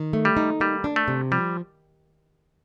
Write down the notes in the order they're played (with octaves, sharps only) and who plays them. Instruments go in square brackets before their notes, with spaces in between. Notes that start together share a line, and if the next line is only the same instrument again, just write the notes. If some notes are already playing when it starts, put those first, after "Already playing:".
Already playing: [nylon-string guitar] D#3
A3
[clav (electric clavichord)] G3
[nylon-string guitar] D#4
[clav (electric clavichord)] G3 [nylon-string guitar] A#3
[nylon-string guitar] D4
[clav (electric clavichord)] A3
[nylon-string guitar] C3
[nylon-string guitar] F3 [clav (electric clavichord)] G3